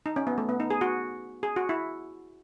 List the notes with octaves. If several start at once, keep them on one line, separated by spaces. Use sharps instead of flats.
D#4
C#4
B3
A3
B3
D#4
G#4
F#4
G#4
F#4
E4